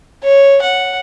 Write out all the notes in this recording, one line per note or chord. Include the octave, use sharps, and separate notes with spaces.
C#5
F#5